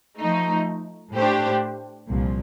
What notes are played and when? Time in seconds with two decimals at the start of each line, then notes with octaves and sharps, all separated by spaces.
0.20 F3 A3 D#4
1.15 A2 A3 D4 G4 C5
2.08 C2 A#2 F3